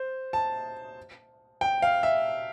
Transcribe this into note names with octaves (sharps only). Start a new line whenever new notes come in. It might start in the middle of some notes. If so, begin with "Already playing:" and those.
Already playing: C5
A5
G5
F5
E5